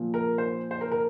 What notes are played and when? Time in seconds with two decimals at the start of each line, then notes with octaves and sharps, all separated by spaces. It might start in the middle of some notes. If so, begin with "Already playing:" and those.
Already playing: A#2 F3
0.14 A#4
0.38 C5
0.71 C5
0.81 A#4
0.92 A#4